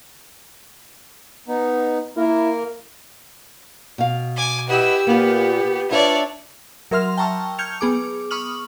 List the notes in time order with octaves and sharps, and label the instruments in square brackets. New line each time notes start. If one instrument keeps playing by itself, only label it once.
[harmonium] B3 D#4
[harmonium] A#3 A#4 [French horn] E4
[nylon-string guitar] B2 F5
[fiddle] G#5 D6
[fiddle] E4 E6 [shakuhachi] G4 [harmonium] B4 D#5 F#5
[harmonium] A#2 [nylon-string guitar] A#3 F4 [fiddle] B3
[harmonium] D4 [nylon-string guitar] F4 B4 [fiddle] C#5 D5 [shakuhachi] E5
[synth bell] F#3 A#4 E5 C6 F6 F7
G5 A5 A#5 C#6 E6 F6
F6 G6 G#6 C#7 F7
B3 G#4 D6
B5 C#6 D#6 F6 F#7